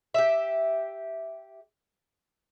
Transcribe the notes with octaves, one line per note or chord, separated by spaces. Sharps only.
G4 E5